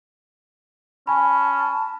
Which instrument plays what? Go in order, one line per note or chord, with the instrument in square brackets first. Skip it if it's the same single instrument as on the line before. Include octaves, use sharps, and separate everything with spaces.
[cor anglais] C#4 [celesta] G#5 B5 [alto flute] A5